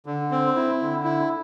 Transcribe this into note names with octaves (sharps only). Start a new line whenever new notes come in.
D3
C4
E4
D3
E4